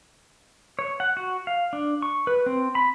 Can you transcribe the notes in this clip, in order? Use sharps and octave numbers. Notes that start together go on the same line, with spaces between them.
C#5
F#5
F#4
F5
D4
C#6
B4
C4
B5